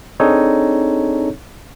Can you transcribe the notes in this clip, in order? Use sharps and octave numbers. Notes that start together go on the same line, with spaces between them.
C4 D4 D#4 G#4 A4 C#5